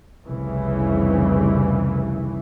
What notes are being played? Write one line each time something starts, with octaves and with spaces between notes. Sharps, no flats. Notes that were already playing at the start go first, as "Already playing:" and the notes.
F1 C2 C#3 E3